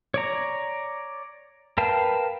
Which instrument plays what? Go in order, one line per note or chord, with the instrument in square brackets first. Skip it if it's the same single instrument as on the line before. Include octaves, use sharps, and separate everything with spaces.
[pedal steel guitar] C#5 D5 A#5
A#4 B4 F5 G5 A5